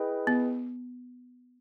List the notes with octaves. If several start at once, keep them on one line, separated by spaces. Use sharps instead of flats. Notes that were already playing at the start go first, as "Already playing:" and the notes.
Already playing: E4 G#4 B4 D#5 G5
B3